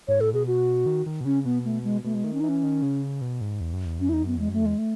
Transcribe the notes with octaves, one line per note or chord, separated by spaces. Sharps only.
G#2 C#5
A2 A4
B2 G#4
F#4
D#3
D#3
B2
C#3 C#4
B2 B3
A3
G#3
B2 A3
G#3
D#3 A3
C#4
D#4
E3 C#4
D#3
C#3
B2
G#2
E2
F#2
E2
F#2 C#4
E2 D#4 E4
F#2 B3
E2 G#3
F#2 A3
E2 G#3
A3